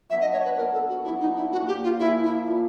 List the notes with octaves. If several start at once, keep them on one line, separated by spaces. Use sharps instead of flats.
F#3 B3 D4 E5
D#5
C#5
B4
F#3 B3 D4 A#4
A4
F#4
F#3 B3 D4 E4
D#4
E4
A#2 F3 A#3 F#4
G4
F4
A#2 F3 A#3 E4
E4
A#2 F3 A#3